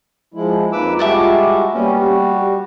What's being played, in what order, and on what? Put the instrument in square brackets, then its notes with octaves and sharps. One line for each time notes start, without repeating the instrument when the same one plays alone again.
[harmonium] F3 G#3 E4
[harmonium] F2 A#3 D#4 [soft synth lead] F4 [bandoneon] B4 D6 E6
[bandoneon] G3 G#3 [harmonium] F#4 [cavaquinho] E5 A5 D6
[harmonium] G3 [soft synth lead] A#3 [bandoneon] B3 C#4
[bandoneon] F#4 [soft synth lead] G4